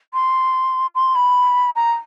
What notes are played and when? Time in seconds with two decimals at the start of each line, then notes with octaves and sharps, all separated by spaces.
0.14 C6
0.95 C6
1.15 B5
1.76 A#5